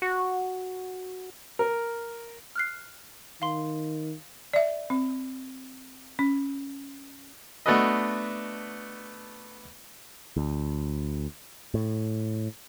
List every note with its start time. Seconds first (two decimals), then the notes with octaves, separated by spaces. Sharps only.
0.02 F#4
1.59 A#4
2.56 F6 F#6 C7
3.42 D#3 F5 C6
4.53 D5 E5
4.90 C4
6.19 C#4
7.66 A3 B3 D4 F#4 B4 D#5
10.37 D2
11.74 A2